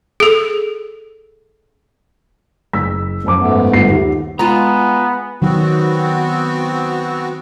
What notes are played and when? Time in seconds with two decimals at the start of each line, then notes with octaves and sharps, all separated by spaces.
0.20 G#4 A4
2.73 F#1 E6 B6
3.24 F#2 F3 A5 D6
3.40 G#2 A3 B3
3.72 G1 F4 C7
3.89 D#2
4.39 G#3 B3 F4 G#5 A#5
5.42 D#3 F#3 B3 C4 D#4 F#4